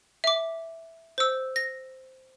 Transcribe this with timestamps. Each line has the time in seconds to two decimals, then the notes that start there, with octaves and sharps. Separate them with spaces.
0.24 E5 D6
1.18 C5 E6
1.56 A#6